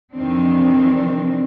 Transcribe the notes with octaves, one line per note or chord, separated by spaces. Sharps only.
F2 C3 D#3 E3 C4 D4